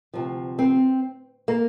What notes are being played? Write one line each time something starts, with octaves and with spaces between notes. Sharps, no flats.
D2 C3 F3
C4
A#3